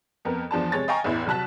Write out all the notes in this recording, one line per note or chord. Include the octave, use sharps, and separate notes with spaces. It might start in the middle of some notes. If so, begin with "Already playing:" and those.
F2 B3 A#4
E2 F3 D4 A5
C3 G#3 C#5 A6
D#5 F5 G5 G#5 A#5 C#6
A1 E2 E4
C2 F#3 A5 F#6 B6